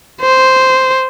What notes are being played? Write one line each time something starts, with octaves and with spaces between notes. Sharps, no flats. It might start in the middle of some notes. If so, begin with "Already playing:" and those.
C5